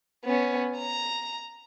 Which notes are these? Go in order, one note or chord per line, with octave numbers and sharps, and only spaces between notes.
B3 C#4
A#5